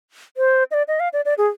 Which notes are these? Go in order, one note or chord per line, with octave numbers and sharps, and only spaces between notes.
C5
D#5
D5
D#5
F5
D5
D5
G#4